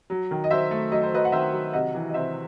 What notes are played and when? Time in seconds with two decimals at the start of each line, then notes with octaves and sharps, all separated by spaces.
0.10 F#3
0.31 D#3
0.44 D#5
0.51 F#3 C5 E5
0.71 A3
0.92 F#3 D#5
1.03 C5
1.12 F#3 B4 D#5
1.25 F#5
1.32 D#3 C5 E5
1.53 F#3
1.73 C3 D#5 F#5
1.95 E3
2.09 D#5
2.14 C3 C5 E5